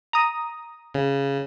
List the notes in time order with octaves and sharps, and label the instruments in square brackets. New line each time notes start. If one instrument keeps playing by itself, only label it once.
[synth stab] A#5 D#6
[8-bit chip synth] C#3